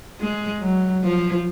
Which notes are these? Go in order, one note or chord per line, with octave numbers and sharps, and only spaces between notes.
G#3
F#3
F3